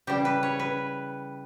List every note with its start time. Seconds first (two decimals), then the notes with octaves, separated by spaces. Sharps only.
0.07 C#3 E3 G3 G4
0.25 B4
0.43 C#5
0.60 B4